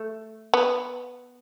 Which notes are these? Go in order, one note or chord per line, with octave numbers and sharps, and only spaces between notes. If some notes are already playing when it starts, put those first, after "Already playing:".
Already playing: A3
B3